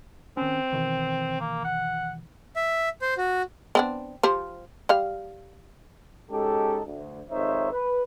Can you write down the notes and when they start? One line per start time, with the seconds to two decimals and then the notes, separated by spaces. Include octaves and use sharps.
0.37 D#3 C4 C#4
0.72 B2 D#3 E3
1.40 A#3
1.64 F#5
2.56 E5
3.02 C5
3.18 F#4
3.75 B3 C4 D4
4.23 F3 G4 C5
4.89 G3 F5
6.31 G#3 C#4 D#4 G4 A4
6.86 D2
7.29 G#1 F2 D#4 C5 C#5 E5
7.71 B4